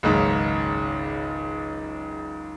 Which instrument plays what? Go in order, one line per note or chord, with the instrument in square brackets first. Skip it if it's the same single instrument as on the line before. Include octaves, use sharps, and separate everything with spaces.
[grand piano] F#1 C#2 G#2 D#3